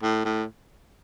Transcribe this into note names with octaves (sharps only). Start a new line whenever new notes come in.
A2
A2